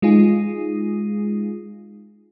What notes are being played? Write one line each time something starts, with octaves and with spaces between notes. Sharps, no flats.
G#3 D#4 F4 G#4